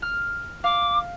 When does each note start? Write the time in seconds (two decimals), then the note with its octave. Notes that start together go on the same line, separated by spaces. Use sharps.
0.02 F6
0.64 F5 D6